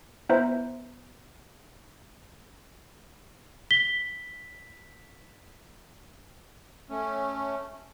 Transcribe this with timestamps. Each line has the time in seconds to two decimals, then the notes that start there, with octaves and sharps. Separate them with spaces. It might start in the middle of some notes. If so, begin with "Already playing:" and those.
0.29 B3 E4 B4 C5 E5 A#5
3.71 B6 G7
6.90 A3 C#4